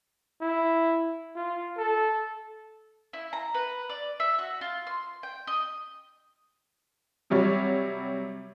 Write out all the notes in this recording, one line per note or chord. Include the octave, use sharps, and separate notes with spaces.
E4
F4
A4
E4
A#5
B4
D5
E5
F#4
F4
C6
G5
D#5
C3 F#3 G3 C#5